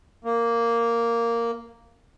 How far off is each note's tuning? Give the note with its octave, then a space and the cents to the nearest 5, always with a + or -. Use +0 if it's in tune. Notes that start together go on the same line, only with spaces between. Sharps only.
A#3 -5